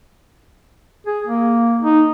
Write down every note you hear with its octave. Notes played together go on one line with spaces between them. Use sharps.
G#4
A#3
D#4